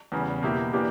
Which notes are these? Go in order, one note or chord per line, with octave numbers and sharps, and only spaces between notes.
E2 C#3 G3
B2 A#3 E4 G4
E3 A#3 D4 G4